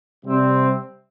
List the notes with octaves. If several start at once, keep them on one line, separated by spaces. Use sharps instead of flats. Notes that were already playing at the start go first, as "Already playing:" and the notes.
C3 G3 C4